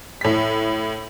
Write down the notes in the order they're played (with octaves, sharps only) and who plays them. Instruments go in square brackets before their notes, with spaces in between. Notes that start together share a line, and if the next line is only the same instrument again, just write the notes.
[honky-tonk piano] A2 B6